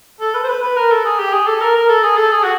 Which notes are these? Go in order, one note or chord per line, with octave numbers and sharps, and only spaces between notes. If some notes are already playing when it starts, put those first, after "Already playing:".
A4
B4
C5
B4
B4
A#4
A4
G#4
G4
G#4
A4
A#4
A#4
A4
G#4
A4
G#4
F#4